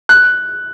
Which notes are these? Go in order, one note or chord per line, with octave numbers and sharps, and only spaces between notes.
F#6